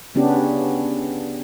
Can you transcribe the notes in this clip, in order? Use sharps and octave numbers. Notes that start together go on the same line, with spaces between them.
C#3 B3 C#4 D4 G4